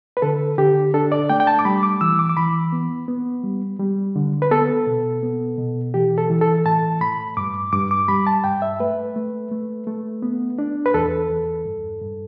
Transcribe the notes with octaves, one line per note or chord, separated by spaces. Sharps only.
B4
D3 A4
D3 G4
D4 A4
D5
A3 G5
G5
A5
D6
G3 B5
D6
E3 E6
D6
D6
E3 B5
B3
B3
G3
G3
D3
B4
B3 A4
B2
B3
B2
E3 G4
A4
E3
A4
A2 A5
A2 B5
G2 D6
G2 D6
D6
G3 B5
A5
G2 G5
E5
A3 B4
A3
A3
A3
B3
D4
B4
E2 A4
E2
G2
G2